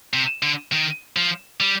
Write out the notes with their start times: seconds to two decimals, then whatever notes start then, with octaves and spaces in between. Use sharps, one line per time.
0.13 C3
0.42 D3
0.72 D#3
1.16 F3
1.60 G3